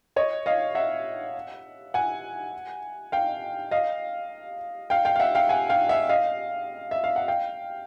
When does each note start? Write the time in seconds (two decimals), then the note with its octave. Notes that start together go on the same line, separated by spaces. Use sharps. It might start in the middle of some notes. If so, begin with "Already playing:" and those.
0.16 C#5 D#5
0.46 D#5 F5
0.75 E5 F#5
1.94 F#5 G#5
3.12 F5 G5
3.71 D#5 F5
4.90 F5 G5
5.05 F5 G5
5.16 F5
5.20 E5 F#5
5.35 F5 G5
5.49 F#5 G#5
5.70 F5 G5
5.89 E5 F#5
6.09 D#5 F5
6.91 E5
7.04 F5
7.16 F#5
7.28 F5 G5